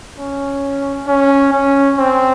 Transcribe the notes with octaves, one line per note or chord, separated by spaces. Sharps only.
C#4
C#4
C#4
C4